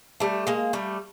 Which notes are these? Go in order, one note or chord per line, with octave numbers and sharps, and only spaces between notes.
G3 A3
G#3 A#3
G3 A3